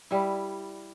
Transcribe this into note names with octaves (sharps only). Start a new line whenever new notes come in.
G3 E4